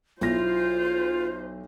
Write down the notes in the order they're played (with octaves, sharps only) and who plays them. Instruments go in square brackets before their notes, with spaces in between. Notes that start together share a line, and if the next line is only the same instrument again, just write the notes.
[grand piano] B1 E4 A#6 [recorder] F4 [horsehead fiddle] C5